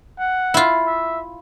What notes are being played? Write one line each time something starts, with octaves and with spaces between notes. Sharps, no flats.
F#5
E4 F4
E5